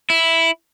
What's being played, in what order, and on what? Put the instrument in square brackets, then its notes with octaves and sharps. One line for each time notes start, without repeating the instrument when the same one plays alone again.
[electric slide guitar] E4